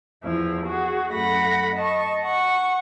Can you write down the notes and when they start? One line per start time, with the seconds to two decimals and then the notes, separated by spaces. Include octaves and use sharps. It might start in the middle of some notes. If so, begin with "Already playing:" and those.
0.24 E2 F3 E4
0.66 F#4 G#4
1.13 F#2 A3 F#5 B5 A#6
1.77 D#5 A5 C#6
2.24 F#5 C#6